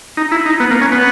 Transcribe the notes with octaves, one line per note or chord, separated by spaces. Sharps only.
D#4
E4
D#4
B3
A#3
C#4
B3